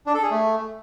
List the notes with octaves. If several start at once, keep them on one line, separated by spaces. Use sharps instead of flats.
D4
A4
G#4
A3